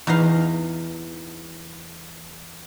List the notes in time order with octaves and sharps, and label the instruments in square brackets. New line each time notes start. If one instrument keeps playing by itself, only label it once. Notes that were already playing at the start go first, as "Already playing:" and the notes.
[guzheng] E2 D#4 D#5 F5